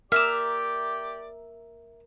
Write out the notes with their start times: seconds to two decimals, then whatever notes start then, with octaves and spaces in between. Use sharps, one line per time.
0.12 G4 A#4 D5 E5 A#5 D6 F6 E7